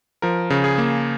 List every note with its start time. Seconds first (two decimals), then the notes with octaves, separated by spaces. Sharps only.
0.22 F3 A#4
0.50 C#3
0.64 G#4
0.78 A#3